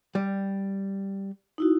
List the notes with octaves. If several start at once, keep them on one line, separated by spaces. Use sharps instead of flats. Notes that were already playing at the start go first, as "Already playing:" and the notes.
G3
D#4 E4 F#4